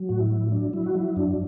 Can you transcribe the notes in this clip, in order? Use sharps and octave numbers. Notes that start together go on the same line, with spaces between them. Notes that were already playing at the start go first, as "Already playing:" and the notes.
Already playing: F#3
A2 F#4
E4
F#3
F#3 D4
F#3 E4
F#4
F#3 E4
F#2 D4